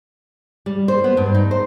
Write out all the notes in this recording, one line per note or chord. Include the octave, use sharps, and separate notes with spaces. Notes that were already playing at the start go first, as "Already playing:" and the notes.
G3
C5
B3
G2
D#4
C5